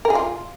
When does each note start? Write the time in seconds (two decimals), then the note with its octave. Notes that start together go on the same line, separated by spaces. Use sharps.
0.05 A#4
0.10 G#4
0.15 F4